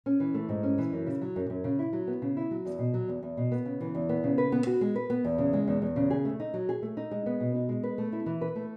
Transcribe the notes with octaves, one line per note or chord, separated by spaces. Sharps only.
C#4
E3
A3
G#2
C#4
E3
F#2
C#3
F#3
F#2
F#2
C#3
E4
F#3
B3
C#3
E4
F#3
E2
B2
F#3
E2
E2
B2
B3
C#3
E3
E2
B3
C#3
B4
B3
F#4
G#3
B4
B3
E2
C#3
G#3
E2
E2
C#3
G#4
A3
D#4
F#3
G#4
A3
D#4
G#3
B3
B2
D#4
G#3
B4
A3
E4
E3
B4
A3